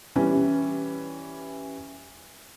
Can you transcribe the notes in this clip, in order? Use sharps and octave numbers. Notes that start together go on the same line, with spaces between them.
E3 G3 C#4